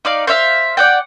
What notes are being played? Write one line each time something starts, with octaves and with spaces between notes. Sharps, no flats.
D#4 D5 F5
C5 C#5 E5 F5
D5 F#5 G5